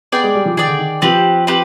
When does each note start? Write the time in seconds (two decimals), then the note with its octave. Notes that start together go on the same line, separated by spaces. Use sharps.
0.12 B3 G#4 D5 G5
0.24 G#3
0.35 G3
0.46 F3
0.57 D#3 G#4 D5 G5
0.68 D3
0.79 D#3
1.02 F3 C4 G4 B4
1.47 C4 G4 B4